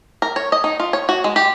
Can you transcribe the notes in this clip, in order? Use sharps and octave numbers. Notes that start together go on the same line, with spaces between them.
A#4
C#5
D#5
D#4
F4
C#5
F#4
G#3
G4